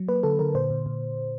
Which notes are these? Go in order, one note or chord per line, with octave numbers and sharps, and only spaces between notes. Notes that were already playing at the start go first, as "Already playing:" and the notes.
Already playing: F#3
A#3 B4
D3 A4
D3 A#4
A#2 C5
A#2
A#2